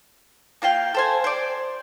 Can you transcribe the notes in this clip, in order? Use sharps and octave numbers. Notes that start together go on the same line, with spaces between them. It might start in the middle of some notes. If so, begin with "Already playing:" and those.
A#3 F4 F5 G5
A4 C5 G#5
C5 D5